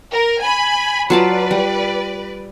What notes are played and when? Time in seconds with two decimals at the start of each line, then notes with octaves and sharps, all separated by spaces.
0.11 A#4
0.41 G#5 B5
1.10 F#3 F4 B4 D5 A5
1.51 G3